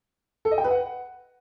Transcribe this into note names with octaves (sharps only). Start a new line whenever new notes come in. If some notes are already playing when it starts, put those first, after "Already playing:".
A4
D#5
G5
B4
F#5